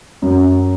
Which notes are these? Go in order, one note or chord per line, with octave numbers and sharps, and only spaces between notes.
F#2